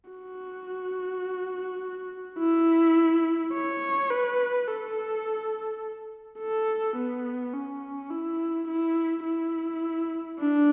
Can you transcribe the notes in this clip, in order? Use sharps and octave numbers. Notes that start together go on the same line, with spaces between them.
F#4
E4
C#5
B4
A4
A4
B3
C#4
E4
E4
E4
D4